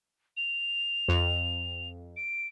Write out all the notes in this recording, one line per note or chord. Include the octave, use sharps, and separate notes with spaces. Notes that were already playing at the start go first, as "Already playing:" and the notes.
F7
F2
D7